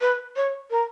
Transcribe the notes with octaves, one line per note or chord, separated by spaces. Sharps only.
B4
C#5
A#4